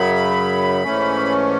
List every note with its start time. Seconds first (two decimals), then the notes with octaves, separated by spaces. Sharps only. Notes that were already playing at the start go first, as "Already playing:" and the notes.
Already playing: F#2 C#3 F#3 B5
0.84 G#2 E3 A3 C#4